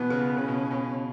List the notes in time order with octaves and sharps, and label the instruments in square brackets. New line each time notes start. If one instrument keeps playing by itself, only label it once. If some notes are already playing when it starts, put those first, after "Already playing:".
Already playing: [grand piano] B2 E3 [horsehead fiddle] B3
[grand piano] C#3
[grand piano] C#3 [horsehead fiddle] C#4
[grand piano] B2
B2